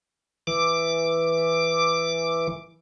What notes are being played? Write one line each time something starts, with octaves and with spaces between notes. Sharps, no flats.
E3 D6